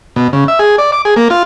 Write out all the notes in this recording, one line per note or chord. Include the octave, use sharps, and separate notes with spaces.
B2
C#3
E5
G#4
D5
D6
G#4
A#3
F4